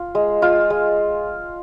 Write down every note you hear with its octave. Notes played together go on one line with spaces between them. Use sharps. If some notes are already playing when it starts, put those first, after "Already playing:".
Already playing: F4
G#3
F4
G#3